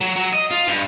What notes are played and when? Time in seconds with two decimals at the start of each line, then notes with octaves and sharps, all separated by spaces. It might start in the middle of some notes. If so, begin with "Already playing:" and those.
0.01 F#3
0.16 F#3
0.33 D#5
0.51 F4
0.68 G2